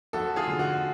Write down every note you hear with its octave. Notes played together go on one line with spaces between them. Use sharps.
F2 F#4 A4
F4 G#4
D3
F#4